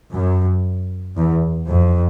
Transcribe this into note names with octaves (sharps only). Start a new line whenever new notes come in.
F#2
E2
F2